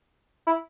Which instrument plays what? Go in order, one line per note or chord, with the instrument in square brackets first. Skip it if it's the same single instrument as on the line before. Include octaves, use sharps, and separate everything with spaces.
[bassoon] E4